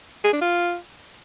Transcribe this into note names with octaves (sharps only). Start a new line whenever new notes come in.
G#4
D4
F4